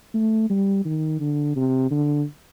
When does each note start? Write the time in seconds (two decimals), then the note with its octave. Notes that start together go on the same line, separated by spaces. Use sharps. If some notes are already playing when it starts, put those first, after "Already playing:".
0.14 A3
0.50 G3
0.86 D#3
1.20 D3
1.56 C3
1.91 D3